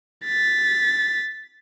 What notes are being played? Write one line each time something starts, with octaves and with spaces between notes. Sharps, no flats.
A6 B6